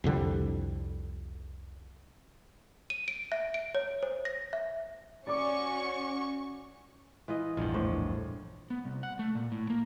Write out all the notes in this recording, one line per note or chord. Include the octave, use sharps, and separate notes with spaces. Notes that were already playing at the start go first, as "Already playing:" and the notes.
C2 F2 D3 G3
D#7
D7
E5
D7
C#5
C5
A#6
E5
C#4 F#4 D5 C#6 D6
E3 F4 D#5
A#1 E2 G2 F4
A2 C5
B3
C2
F#5
A3
A#2
A2
A#3